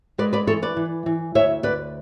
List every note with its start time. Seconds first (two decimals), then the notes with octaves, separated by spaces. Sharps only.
0.18 G#3 B4 D5
0.33 B4 D5
0.47 E3 A4 C#5
0.62 B4 D5
0.77 E3
1.06 E3
1.35 D2 C#5 E5
1.63 D2 B4 D5